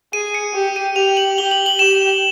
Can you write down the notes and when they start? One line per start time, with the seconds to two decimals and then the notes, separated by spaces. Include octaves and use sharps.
0.13 G#4 D#7
0.34 C#7
0.54 G4
0.76 D#7
0.96 G4 F7
1.17 F#7
1.38 G4 G7
1.51 F#7
1.66 F#7
1.79 G4 E7